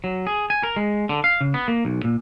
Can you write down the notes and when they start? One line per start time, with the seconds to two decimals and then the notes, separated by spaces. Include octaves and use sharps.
0.04 F#3
0.27 G#4
0.50 G#5
0.63 A#4
0.76 G#3
1.09 D3
1.24 F5
1.41 C#3
1.54 B3
1.68 A#3
1.85 B1
2.04 A#2